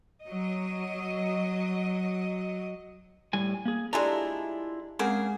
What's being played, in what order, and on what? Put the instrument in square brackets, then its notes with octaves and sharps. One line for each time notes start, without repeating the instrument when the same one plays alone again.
[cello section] F#3 D#5
[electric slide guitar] A2 G3 G#5
A#3 G#4
[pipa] G#3 A3 D4 [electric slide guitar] E4 F4 A#5 [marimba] G4 D5
[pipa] C#3 A#3 G#4 [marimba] G#3 C4 F#5